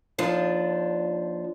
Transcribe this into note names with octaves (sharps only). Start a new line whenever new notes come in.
D#2 F3 D4